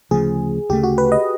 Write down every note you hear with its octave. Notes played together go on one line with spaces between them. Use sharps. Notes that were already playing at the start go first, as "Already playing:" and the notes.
D2 C#3 F3 A3 G#4
D2 C#3 F3 A3 G4
F#4
B4
D#5